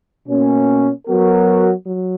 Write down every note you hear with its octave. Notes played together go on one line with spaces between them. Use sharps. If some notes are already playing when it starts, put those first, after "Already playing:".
B2 A#3 C#4
F#3 B3 F#4 A#4
F#3